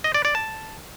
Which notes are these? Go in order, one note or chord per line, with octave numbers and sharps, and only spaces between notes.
D#5
D5
D5
A5